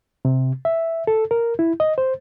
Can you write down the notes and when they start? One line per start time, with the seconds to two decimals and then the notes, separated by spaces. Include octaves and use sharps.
0.25 C3
0.65 E5
1.07 A4
1.31 A#4
1.59 E4
1.80 D#5
1.98 C5